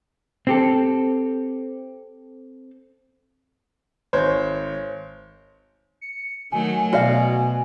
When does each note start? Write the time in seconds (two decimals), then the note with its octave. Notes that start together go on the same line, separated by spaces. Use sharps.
0.47 C4 G4 A4
4.13 G#1 C5 C#5
6.01 C#7
6.52 D#3 F#3 A3 G#5
6.93 B2 F#4 D5 F5